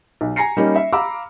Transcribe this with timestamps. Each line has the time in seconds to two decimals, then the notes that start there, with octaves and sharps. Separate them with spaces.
0.21 B1
0.36 G#5 A#5 A#6 C7 C#7
0.57 G3 A#3 C#4 D#4 D#5
0.76 E5
0.93 F5 A#5 B5 D6 E6